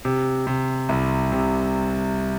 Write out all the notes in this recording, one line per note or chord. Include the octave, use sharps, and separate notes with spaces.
C3
C3
C2
C3